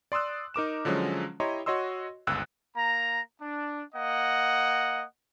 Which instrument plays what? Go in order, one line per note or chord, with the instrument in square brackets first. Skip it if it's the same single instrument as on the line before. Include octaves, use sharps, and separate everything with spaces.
[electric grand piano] D5 C6 D#6 E6 F#6
D#4 A#4 D6 E7
D3 F3 F#3 G#3 C#4
E4 G4 C#5 D#5 A#5 C6
F#4 C#5 D#5 C6 E6
G1 C#2 E6 F#6
[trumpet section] A#3 A#5
D4
A#3 D#5 F#5